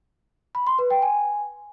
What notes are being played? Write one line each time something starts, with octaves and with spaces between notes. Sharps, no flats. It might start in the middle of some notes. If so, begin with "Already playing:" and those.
B5
C6
B4
G5
G#5